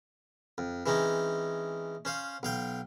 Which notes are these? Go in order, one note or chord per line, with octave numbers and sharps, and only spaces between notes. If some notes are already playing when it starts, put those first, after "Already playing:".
F2
E3 G#3 C4 C#4 D#4
C#4 C5 F5
B1 F5 G5